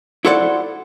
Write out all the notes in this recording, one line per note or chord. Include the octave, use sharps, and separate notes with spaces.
E4 F#4 A4 C5 D5 F#5